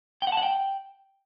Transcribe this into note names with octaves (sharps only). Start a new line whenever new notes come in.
G5
F#5
A5
F#5
G5